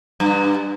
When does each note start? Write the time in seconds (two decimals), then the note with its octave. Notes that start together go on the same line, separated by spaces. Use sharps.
0.20 G2